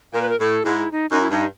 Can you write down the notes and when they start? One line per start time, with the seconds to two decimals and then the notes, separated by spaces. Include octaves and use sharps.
0.13 A#2 A#4
0.22 B4
0.29 A#4
0.39 A2 A4
0.65 G#2 E4
0.92 D#4
1.10 F#2 D#4
1.21 E4
1.30 G2 D#4